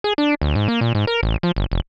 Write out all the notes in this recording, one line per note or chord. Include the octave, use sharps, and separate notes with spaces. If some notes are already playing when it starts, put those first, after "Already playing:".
G#4
D4
D2
G#2
A#3
A#2
G#2
A#4
A1
F3
G1
F1